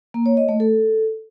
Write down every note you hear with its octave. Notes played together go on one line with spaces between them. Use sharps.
A#3
C#5
D#5
A3
A4